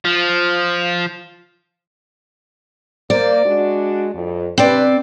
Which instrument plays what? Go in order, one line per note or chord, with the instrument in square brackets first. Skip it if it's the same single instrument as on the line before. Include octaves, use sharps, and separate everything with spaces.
[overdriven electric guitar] F3
[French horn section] A#3 C5 [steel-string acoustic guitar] D5
[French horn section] G#3 D4 F#4
F2
[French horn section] C3 D4 B4 [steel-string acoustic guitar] C4 D5